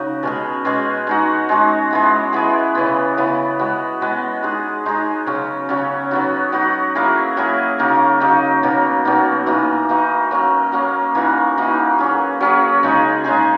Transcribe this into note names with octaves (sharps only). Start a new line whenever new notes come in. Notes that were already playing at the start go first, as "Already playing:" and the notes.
Already playing: C#3 D#4 F#4
B2 G#3 C#4 G#4
B2 G#3 C#4 G#4
G#3 D#4 F#4
G#3 D#4 F#4
G#3 B3 E4 G#4
G#3 B3 E4 G#4
C#3 E3 B3
C#3 E3 B3
G#3 B3 F#4
G#3 B3 F#4
G#3 D#4 G#4
G#3 D#4 G#4
C#3 F#3 C#4
C#3 F#3 C#4
F#3 B3 D#4 F#4
F#3 B3 D#4 F#4
F#3 A#3 E4 G#4
F#3 A#3 E4 G#4
C#3 F#3 A#3 D#4
C#3 F#3 A#3 D#4
B2 F#3 A#3 D#4
B2 F#3 A#3 D#4
E3 A#3 D#4 F#4
E3 A#3 D#4 F#4
F#3 A#3 C#4
F#3 A#3 C#4
E3 A#3 D#4 F#4
E3 A#3 D#4 F#4
F#3 C#4 G#4
F#3 C#4 G#4
C#3 G#3 D#4 G#4
C#3 G#3 D#4 G#4